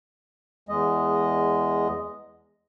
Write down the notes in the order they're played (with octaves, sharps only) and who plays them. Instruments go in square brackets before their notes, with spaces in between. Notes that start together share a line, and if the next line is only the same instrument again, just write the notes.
[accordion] E2 G#3 D#5